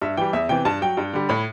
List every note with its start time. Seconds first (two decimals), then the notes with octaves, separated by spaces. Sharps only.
0.02 G2 E5
0.17 E3 G3 G5
0.33 E2 E5
0.49 C3 E3 G5
0.65 G2 A5
0.82 F#3 G5
0.97 G2
1.14 D3 G3
1.29 A2 B5